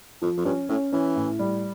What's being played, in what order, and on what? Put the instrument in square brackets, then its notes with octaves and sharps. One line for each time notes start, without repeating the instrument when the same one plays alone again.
[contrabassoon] F2 [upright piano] F3
[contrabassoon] F2
[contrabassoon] G2 [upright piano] C#4
[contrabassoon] A2 [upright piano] C#4
[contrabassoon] E3 [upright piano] C#4
[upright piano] A2
G3